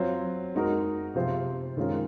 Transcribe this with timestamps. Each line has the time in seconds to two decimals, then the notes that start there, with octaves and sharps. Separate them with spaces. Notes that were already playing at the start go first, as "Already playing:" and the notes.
Already playing: F#3 C4 F4
0.55 G#3 D#4 F#4 A#4
1.15 C3 F3 C4 F4 C5
1.77 D#3 G#3 C#4 F4 A#4